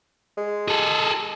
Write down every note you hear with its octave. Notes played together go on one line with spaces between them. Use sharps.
G#3
G#4 A4